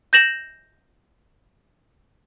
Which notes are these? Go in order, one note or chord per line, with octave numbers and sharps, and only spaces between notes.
G6 A#6 E7 F#7